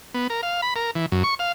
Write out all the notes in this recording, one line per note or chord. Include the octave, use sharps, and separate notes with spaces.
B3
A#4
F5
B5
A#4
E3
F#2
C#6
F5